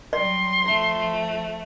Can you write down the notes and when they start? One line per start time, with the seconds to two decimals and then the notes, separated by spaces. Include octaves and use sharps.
0.13 F#3 G3 D5 C6
0.65 F3 A3